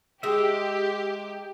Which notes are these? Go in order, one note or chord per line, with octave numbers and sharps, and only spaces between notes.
G#3 D#4 G4 E5